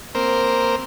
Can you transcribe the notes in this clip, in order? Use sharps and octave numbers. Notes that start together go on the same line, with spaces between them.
A#3 C4 A#4 C5